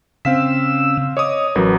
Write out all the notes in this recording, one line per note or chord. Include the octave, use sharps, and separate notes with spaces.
C#3 C4 F5 E6 B6
C#5 D#5 D6 D#6
A1 F#3 A#4 B4